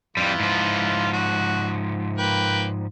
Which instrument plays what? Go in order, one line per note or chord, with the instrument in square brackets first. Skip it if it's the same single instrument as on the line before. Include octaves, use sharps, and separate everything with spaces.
[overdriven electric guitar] F2 G3 [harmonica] E3 F4
[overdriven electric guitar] G#2 F3
[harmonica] F#4
A#3 B4 G5